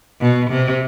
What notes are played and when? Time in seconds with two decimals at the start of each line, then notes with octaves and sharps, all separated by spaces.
0.21 B2
0.51 C3